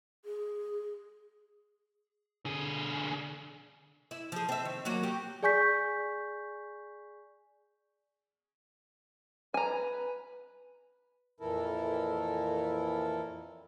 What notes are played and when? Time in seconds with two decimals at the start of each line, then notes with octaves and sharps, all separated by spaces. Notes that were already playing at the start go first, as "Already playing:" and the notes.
0.25 G#4
2.45 D3 G#4
4.11 E4
4.32 F3 G#4
4.49 C4 E5
4.65 D#3
4.85 F#3 A#3 F#4
5.03 G4
5.43 G#4 D5 G#5 C#6 G6 B6
9.54 B4 G#5 A#5
11.40 F2 A#2 E3 E4 A4 A#4